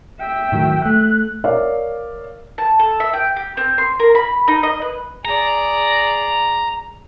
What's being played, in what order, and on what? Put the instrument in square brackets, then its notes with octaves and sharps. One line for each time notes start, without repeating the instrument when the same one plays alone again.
[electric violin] E5 G5
[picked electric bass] A2 D#3 F#3
[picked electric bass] A3 [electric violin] F#6
[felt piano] A#4 C#5 D5 E5 F5
[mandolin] A5
A4
E5
G5
G4
C4
C6
A#4
B5
D#4
D#5
B4
[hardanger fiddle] G#4 D5 [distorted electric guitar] A#5